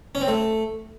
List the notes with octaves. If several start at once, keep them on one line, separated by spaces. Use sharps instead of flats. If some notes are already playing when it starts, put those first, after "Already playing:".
C#4
C4
A3